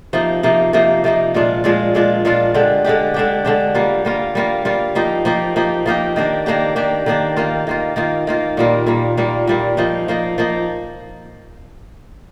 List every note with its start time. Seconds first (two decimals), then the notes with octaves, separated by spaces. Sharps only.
0.13 C3 F3 A#3 D#4
0.43 C3 F3 A#3 D#4
0.73 C3 F3 A#3 D#4
1.04 C3 F3 A#3 D#4
1.34 A#2 G#3 D4 F4
1.64 A#2 G#3 D4 F4
1.95 A#2 G#3 D4 F4
2.25 A#2 G#3 D4 F4
2.54 D3 G#3 D4 G4
2.85 D3 G#3 D4 G4
3.14 D3 G#3 D4 G4
3.45 D3 G#3 D4 G4
3.75 G3 A#3 F4
4.05 G3 A#3 F4
4.35 G3 A#3 F4
4.65 G3 A#3 F4
4.95 F3 A#3 D#4 G4
5.25 F3 A#3 D#4 G4
5.56 F3 A#3 D#4 G4
5.86 F3 A#3 D#4 G4
6.16 D#3 A#3 D4 G4
6.46 D#3 A#3 D4 G4
6.76 D#3 A#3 D4 G4
7.06 D#3 A#3 D4 G4
7.37 D#3 A#3 F4
7.67 D#3 A#3 F4
7.96 D#3 A#3 F4
8.27 D#3 A#3 F4
8.57 A#2 G3 A#3
8.86 A#2 G3 A#3
9.17 A#2 G3 A#3
9.47 A#2 G3 A#3
9.77 F3 A#3 D#4
10.08 F3 A#3 D#4
10.38 F3 A#3 D#4